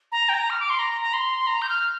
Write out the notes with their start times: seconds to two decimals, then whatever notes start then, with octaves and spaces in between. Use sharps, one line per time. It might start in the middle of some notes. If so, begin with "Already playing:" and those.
0.12 A#5
0.29 G5
0.34 A#5
0.50 F6
0.60 D6
0.70 C6
0.79 A#5
1.01 A#5
1.13 C6
1.47 A#5
1.62 G6
1.69 F6